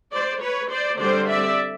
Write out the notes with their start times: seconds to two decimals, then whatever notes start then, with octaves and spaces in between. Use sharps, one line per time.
0.13 C5 D5
0.41 B4 C#5
0.70 C5 D5
0.99 D3 G3 C4 C5 D5
1.28 D5 E5